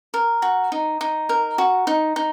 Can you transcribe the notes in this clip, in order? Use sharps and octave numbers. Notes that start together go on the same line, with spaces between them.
A#4
F#4
D#4
D#4
A#4
F#4
D#4
D#4